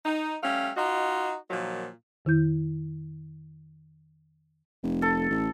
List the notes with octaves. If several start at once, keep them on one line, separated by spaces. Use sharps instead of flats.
D#4
G3 A3 C#4 F5
D#4 F4 F#4 D#5
A#2 D#3 F3 F#3
F2 D#3 E4 G6
F1
A4
A1